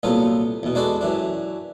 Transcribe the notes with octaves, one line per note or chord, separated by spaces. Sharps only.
C2 A#2 F#3 B3 F4 A4
E2 B2
G#3 D4 F#4 A4 B4 D5
F#2 E3 D4